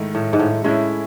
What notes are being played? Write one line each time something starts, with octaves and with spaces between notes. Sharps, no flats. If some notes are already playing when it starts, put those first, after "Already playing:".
Already playing: G#2 D#3 A3 E4 A4
A2
G#2
A2
A2 G#3 C#4 E4